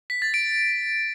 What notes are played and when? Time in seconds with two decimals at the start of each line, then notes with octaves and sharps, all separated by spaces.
0.10 B6
0.22 A6
0.34 D7